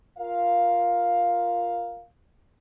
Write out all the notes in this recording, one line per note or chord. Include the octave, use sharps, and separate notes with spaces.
F4 A#4 F5